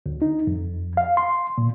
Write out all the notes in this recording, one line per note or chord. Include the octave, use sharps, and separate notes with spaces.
D2
D#4
F2
F5
C6
A#2